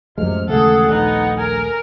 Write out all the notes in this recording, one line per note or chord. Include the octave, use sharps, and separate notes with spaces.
F#2 A2 C3 F3 G#3 F6
D#2 C#3 E3 G#3 A3 G#4 A4 F#5
A#1 B3 D#4 F#5
A#4 G#5